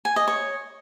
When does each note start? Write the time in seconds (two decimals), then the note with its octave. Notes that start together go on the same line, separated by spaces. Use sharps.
0.05 G#5
0.16 D#5
0.28 C#5